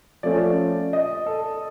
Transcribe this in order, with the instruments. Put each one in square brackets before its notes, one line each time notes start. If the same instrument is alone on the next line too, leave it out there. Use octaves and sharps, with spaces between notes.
[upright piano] F3 A3 C#4 [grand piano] D5
[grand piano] D#5
A4